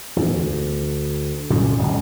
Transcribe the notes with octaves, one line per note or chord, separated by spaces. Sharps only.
E2 G#2
D2
C2 F#2 A#2 D3
D1 C#2